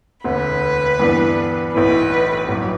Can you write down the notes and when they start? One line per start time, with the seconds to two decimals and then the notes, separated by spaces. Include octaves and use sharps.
0.24 E1 D2 D3 B4
1.00 G2 E3 B3 D4
1.74 B1 A2 E3 B4
2.48 A1 G2 F#3